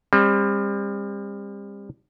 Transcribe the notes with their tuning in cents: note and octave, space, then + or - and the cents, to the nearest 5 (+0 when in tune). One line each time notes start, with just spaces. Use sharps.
G3 +35 C4 +35